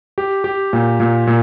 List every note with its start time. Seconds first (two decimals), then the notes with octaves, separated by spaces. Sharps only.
0.18 G4
0.44 G4
0.73 A#2
1.00 A#2
1.27 A#2